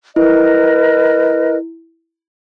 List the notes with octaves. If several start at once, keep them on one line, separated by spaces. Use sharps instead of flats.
E4 A#4 B4 D#5